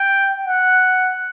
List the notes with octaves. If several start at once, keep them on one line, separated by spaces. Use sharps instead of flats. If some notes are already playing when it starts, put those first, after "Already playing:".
Already playing: G5
F#5